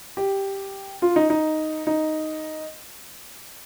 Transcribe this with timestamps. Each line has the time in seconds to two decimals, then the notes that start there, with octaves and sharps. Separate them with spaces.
0.17 G4
1.02 F4
1.16 D#4
1.30 D#4
1.87 D#4